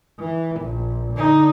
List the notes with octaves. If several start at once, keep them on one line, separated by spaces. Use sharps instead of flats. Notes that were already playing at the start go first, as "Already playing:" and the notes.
E3
A#1
D3 D#4